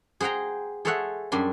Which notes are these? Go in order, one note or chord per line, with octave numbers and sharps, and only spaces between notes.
G#4 C5 F#5 G5 A#5
G#4 A4 C5 C#5 E5 F#5
F#2 G3 D4 G#5 C6